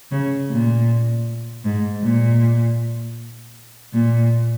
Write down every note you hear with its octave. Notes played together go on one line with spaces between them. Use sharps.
C#3
A#2
G#2
A#2
A#2